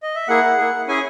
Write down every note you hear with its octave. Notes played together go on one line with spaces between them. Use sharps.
D#5
E5
A#3 E4 G#4 F#5
A#3 E4 G#4
C#4 E4 G#4 G#5